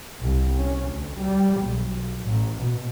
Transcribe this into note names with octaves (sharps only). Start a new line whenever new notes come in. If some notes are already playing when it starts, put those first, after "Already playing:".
C2
C#4
D2
G3
B1
A1
B2